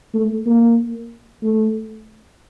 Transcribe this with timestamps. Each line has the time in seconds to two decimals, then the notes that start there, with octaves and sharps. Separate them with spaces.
0.14 A3
0.46 A#3
1.43 A3